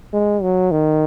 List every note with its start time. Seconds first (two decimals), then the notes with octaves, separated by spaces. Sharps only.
0.13 G#3
0.43 F#3
0.72 D#3